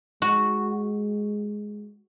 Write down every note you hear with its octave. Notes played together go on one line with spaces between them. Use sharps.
G#3 F#4